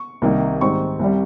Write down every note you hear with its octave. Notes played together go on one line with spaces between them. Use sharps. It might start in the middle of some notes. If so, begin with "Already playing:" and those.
Already playing: C#6
C2 C3 D#3 A#3 D#4
G#2 D#3 G3 C4 C#6
C2 C3 G3